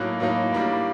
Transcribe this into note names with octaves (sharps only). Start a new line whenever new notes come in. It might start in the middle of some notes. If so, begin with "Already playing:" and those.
Already playing: A2 F#3 A#3 D#4 F#6
A2 F#3 A#3 D#4
A2 G3 A#3 D4